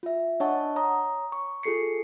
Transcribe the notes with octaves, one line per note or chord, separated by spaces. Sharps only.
F4 E5
D4 C#5 D#5 F#5 A5 C#6
C#5 A#5 D#6
C#6
F4 G#4 A4 C7 C#7